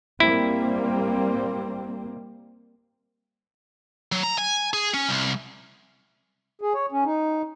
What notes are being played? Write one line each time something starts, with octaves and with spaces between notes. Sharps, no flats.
G3 A#3 C4 E4
F#3
A#5
G#5
G#4
C#4
C2
G#4
C#5
C#4
D#4